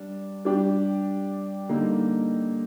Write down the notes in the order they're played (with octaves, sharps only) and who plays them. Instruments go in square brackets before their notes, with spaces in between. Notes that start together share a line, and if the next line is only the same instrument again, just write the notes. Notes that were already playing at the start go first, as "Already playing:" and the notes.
Already playing: [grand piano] G3 D4
G3 D4 G4
D3 G3 A#3 D#4